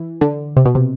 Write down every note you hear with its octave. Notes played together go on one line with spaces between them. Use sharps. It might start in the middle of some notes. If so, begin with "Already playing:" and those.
Already playing: E3
D3
C3
B2
C3